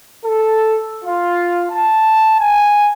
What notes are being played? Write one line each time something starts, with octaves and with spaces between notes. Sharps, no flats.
A4
F4
A5
G#5